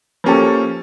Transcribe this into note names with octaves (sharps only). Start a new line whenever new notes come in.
F3 A#3 C#4 G4 A4